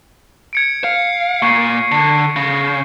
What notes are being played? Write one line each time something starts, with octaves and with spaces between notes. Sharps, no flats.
G#6 C#7 D7
F5
A#2 C#6 C7
D3
C#3